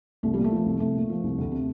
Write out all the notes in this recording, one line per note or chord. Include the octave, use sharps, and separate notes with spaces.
C2 A3
A#2 G3
A3
F3
C2
C2 A3
A#2
F3
C2
D2
C3